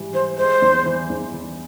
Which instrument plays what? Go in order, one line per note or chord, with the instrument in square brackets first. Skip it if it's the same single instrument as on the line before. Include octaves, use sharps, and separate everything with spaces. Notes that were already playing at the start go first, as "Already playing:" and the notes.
Already playing: [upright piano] G#2 E3 G3
[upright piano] E3 [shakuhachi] C5
[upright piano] G#3 [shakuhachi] C5
[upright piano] E2
E3
E2
E3